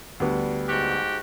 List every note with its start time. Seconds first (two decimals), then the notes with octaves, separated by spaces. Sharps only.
0.20 D2 G3 B3
0.69 G#2 F#4 G4